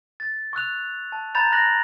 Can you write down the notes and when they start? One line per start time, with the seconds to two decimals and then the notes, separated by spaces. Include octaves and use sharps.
0.20 A6
0.53 C#6 E6 F#6 F7
1.12 A5
1.35 A#5 B5 G6 A6 F7
1.52 F#6 A#6 F#7